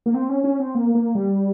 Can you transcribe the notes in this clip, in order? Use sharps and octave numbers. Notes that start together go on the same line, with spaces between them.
A#3
C4
C#4
C#4
C4
A#3
A#3
G3